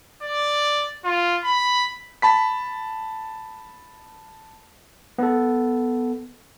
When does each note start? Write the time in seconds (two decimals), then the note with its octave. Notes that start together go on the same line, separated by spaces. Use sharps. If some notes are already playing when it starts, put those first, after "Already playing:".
0.23 D5
1.04 F4
1.44 B5
2.22 A5 B5 B6
5.18 B3 A4